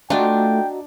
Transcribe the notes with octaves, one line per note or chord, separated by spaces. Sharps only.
A3 D4 F4 F#4 D#5 G5 A#5